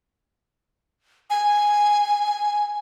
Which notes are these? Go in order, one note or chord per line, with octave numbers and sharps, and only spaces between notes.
G#5